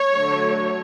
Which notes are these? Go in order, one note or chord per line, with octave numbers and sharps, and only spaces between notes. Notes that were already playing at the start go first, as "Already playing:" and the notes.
Already playing: C#5
D3 F#3 A3